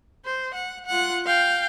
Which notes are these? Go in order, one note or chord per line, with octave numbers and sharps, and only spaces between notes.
C5
F#5
F4 F#5
F5 G5